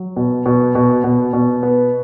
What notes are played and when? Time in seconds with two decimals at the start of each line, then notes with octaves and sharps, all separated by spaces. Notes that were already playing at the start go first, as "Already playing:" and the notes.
Already playing: F#3
0.16 B2
0.46 B2
0.75 B2
1.04 B2
1.33 B2
1.63 B3